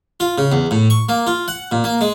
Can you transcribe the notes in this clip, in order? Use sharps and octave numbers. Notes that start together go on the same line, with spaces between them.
F4
C#3
E2
A2
C#6
A#3
F4
F#5
A#2
A#3
G#3